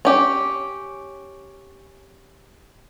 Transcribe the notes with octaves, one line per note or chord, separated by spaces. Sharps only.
C#4 G4